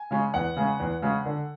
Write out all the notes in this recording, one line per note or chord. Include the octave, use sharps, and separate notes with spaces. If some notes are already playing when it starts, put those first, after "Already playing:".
Already playing: G#5
C#3 G#3 C#4
E2 F#5
C#3 G#3 C#4
E2
C#3 G#3 C#4
D3